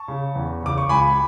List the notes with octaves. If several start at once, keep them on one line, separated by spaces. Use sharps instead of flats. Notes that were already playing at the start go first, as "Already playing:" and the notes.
Already playing: A5 C#6
C#3
E2
C#3 D6
C#6
C#2 G#5 B5